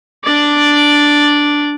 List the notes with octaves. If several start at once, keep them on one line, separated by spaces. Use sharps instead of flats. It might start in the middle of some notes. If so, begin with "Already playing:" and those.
D4 D5